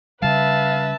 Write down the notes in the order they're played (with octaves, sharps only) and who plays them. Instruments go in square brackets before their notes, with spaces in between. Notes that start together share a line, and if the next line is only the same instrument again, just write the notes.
[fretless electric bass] C#3 G3 [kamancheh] B4 E5 [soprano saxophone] F5 [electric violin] A5